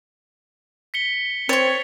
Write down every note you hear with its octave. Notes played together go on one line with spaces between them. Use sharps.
B6 C#7 G7
C4 C#5 C#6 G#6 A6 F7